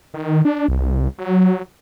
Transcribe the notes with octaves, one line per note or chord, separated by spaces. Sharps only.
D#3
D4
C2
F#3